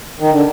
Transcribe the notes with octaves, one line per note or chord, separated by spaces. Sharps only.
D#3
D3